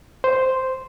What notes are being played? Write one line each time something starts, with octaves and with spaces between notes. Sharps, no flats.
C5